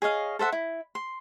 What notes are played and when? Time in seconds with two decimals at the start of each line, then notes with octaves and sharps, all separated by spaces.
0.02 G#4 C#5 D#5 F5
0.39 A4 C5 E5 F#5
0.52 E4
0.95 C6